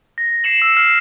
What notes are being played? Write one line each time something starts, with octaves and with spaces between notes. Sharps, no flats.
A#6
C7 C#7 E7 F#7
E6
F6 C7